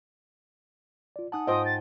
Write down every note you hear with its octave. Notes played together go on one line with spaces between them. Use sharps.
F4 D5
D#4 F#5 G#5 A5 D#6 F#6
G#2 F4 C5 D#5 G5 D#6 D#7
A6